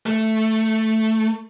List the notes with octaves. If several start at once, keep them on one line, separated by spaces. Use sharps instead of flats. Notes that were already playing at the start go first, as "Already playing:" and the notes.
A3